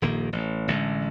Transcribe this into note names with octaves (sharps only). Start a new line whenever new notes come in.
D#1 A#1 D#3 A#3
A1
A1 D3 G#3